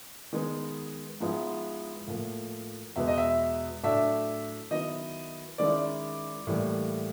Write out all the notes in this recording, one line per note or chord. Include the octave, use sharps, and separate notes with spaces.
D#3 G#3 B3
G#2 F3 G#3 B3 E4
A2 F3 A#3
E2 B2 G#3 B3 E5
D#5
E5
A2 F#3 A3 D4 E5
D#3 F#3 B3 E4 D#5
D#3 G#3 C#4 E4 D5
A2 E3 G3 A#3